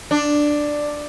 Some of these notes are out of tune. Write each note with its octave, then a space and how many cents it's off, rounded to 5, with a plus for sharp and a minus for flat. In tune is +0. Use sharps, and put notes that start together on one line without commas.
D4 +5